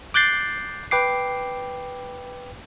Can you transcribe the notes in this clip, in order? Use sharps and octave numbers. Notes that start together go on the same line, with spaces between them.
D6 F#6 G6 A6 C7
B4 G5 D6 C7